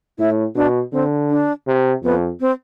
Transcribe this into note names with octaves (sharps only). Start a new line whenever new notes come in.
A2 E4
B2 D4
D3 C4
D4
C3
F2 B3
C4